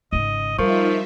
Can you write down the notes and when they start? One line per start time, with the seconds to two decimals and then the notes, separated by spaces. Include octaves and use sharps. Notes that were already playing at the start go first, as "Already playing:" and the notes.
0.13 G#1 C#3 D#5
0.59 F3 G3 D#4 F4 A#4 E5 C#6